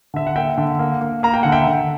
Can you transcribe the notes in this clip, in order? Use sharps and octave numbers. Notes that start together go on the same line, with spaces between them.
D3 E5
F#5
A#3 E5 G5
D3
A#3
A#3
A#3 A#5
G5
D3 F#5
E5 G5
D3